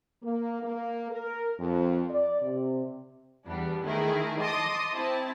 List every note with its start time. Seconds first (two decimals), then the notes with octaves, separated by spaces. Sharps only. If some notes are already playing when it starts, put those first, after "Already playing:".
0.22 A#3
0.62 A#3
1.10 A#4
1.59 F2
2.10 D5
2.41 C3
3.45 E2 G3 B3 D4
3.82 D#3 A3 E4 G#4 A#4
4.39 D#5 A5 C6 D6 D#6
4.92 C4 E4 A5